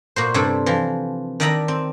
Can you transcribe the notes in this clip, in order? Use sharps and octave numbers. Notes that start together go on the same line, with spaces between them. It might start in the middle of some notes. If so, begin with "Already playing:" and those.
A#2 F#4 C5
G2 C3 G3 E4 A4
E3 F3
D#3 D4 D5 E5 A#5 B5
C4